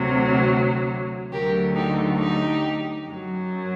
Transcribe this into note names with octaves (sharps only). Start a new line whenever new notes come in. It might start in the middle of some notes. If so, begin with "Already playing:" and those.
Already playing: D2 C3 F#3
D2 D3 F#3 G4 A#4
D#4 G4
D#4 G4
F#2 F#3